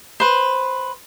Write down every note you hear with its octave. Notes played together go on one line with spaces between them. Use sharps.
B4 C5